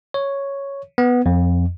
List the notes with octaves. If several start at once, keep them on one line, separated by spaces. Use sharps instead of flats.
C#5
B3
F2